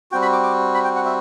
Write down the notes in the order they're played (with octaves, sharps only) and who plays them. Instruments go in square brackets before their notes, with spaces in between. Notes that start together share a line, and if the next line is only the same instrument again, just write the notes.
[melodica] G3 C4 F#4 G5
B5
D6
D6
B5
G5
F#5
E5